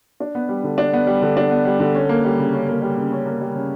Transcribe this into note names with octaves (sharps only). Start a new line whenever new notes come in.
D4
B3
G3
D3
D4
B3
G3
D3
D4
B3
G3
D3
C#4
A#3
G3
C#3
C#4
A#3
G3
C#3
C#4
A#3
G3
C#3